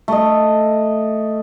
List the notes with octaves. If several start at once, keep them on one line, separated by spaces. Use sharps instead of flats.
A3 D#5